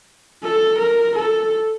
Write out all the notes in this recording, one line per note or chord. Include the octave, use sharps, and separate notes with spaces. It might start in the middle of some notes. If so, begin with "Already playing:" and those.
A4
A#4
A4